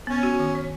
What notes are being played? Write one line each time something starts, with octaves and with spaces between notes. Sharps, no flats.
B3 C#4
F#4
D#3
C#5